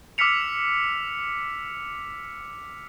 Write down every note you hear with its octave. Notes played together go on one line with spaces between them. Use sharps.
D6 E6 F6 B6 C#7 F7